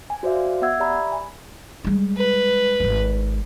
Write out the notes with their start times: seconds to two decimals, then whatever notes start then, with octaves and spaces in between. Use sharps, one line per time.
0.10 G#5
0.23 F#4 C5 D5 E5 F5
0.62 B3 E5 F#5 E6 G#6
0.80 G4 D5 E5 A#5 B5
1.12 G#5
1.84 G3 G#3
2.17 B4
2.80 D#1 G#1